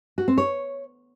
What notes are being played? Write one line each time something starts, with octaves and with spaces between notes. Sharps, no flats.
F#4
C4
C#5